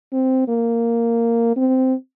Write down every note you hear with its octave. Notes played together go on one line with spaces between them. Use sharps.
C4
A#3
C4